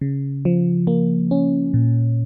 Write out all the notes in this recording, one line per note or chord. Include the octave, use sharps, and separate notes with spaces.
C#3
F3
A#3
C#4
A#2